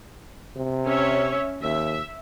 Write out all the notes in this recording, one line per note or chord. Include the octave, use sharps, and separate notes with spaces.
C3
C#4 C#5 E5
D#2 E5